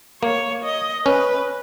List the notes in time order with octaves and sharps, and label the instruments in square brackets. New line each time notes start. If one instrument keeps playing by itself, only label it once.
[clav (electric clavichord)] A#3 [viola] C#5
[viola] D#5
[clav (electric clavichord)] C#4 [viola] B4